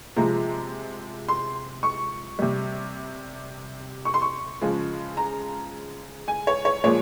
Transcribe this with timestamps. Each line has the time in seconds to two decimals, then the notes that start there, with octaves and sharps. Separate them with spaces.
0.16 C3 F3 G#3 A#5
1.28 C6
1.83 C#6
2.39 C3 G3
4.05 C#6
4.14 C6
4.22 C#6
4.61 C#3 F3 G#3
5.17 A#5
6.28 G#5
6.47 C#5
6.65 C#5
6.84 A#2 F3 G#3 C#5